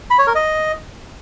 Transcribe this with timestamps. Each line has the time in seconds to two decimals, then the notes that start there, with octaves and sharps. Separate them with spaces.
0.10 B5
0.19 C#5
0.27 A#4
0.35 D#5